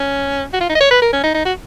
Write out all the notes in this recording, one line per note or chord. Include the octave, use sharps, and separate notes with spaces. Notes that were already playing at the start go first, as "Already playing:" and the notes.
Already playing: C#4
F#4
F4
D#4
D#5
C#5
B4
A#4
C#4
D#4
D#4
F#4